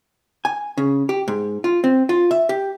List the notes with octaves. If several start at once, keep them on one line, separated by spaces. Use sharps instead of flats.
G#5
C#3
G4
G#2
F4
C4
F4
E5
G4